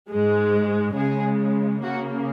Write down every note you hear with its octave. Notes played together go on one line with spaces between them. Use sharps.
G#2 G#3
C#3 G#3 G#4
C#3 A#3 F#4